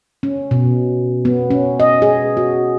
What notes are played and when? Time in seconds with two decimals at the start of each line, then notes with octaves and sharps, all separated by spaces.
0.23 C#4
0.51 B2
1.25 B3
1.51 C#4
1.80 D#5
2.02 G#4
2.37 F#4